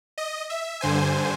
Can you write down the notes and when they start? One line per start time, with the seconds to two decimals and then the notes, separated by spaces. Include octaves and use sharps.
0.18 D#5
0.50 E5
0.81 G2 D3 C5 G#5